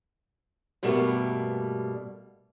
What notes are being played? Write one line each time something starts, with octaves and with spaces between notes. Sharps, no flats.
G2 B2 G3 A3 A#3